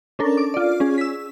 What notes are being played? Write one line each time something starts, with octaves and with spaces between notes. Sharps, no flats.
C#4 D4 A4 A#4
D6
F4 D5
C#4 G#4
E6 B6